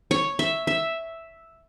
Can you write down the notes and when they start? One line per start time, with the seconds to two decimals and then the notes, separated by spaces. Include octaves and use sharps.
0.11 C#5
0.39 E5
0.67 E5